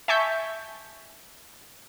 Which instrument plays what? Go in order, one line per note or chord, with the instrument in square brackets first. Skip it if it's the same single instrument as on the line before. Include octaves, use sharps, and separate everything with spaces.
[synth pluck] E5 G#5 A5 C#6 G6 B6